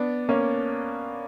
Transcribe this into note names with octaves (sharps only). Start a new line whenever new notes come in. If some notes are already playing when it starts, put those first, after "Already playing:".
Already playing: B3 D4
A#3 C#4